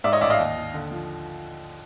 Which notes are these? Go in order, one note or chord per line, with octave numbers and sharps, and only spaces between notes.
G#2 D5 E5
C#5 D#5
A1 D5 E5
D#5 F5
D#2
D#2
D3
F3